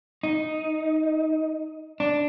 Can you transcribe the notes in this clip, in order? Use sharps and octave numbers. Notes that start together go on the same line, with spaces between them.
D#4
D4